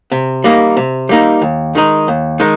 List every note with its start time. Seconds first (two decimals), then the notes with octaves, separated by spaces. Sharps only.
0.12 C3
0.44 G3 A#3 D#4
0.77 C3
1.09 G3 A#3 D#4
1.42 D#2
1.75 D#3 G#3 D#4
2.08 D#2
2.40 D#3 G#3 D#4